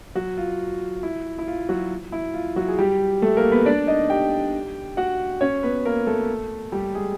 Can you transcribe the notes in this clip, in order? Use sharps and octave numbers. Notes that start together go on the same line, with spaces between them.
F#3 F#4
F4
E4
E4
F4
F#3 F#4
E4
F4
F#3 F#4
G#4
G3 G4
A3 A4
A#3 A#4
B3 B4
D4 D5
D#4 D#5
G4 G5
F#4 F#5
C#4 C#5
B3 B4
A#3 A#4
A3 A4
G3 G4
G#3 G#4